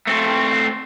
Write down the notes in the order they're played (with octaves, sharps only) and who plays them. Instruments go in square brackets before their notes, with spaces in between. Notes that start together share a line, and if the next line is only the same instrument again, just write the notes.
[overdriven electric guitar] A3 C4